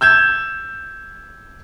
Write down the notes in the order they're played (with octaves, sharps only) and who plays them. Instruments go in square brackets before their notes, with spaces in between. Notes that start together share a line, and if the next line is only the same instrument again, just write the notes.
[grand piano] E6 G6 G#6 E7